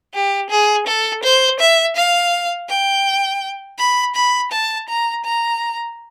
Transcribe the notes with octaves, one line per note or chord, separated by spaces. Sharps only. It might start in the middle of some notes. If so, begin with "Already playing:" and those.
G4
G#4
A4
C5
E5
F5
G5
B5
B5
A5
A#5
A#5